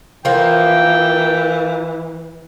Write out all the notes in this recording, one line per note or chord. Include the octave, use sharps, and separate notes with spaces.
E3 F3 A#3 G5